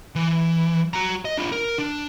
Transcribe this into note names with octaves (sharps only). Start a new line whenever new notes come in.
E3
F#4 A#5
D#5
D4 F4
A#4
D4